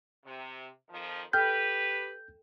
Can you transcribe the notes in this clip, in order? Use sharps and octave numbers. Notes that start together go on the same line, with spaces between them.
C3
F2 D#3 F3
G4 A4 B4 G5 F6 G6